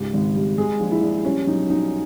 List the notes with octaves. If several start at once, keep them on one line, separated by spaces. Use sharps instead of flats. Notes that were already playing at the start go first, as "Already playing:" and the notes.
Already playing: C#2 G#2 G4
G#1
G3
G#3 G#4
A#1
E4
A#1
G3 C#4
B1 D#4
B1 D#4